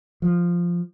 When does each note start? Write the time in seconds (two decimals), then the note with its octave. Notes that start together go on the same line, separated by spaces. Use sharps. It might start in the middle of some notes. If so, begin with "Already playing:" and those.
0.22 F3